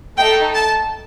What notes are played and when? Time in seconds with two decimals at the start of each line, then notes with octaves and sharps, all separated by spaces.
0.17 A3 D#4 A4 G5
0.54 A5